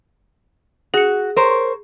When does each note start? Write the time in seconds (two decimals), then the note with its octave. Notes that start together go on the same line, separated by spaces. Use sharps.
0.94 F#4 G#4 C#7
1.36 A#4 C5 C#5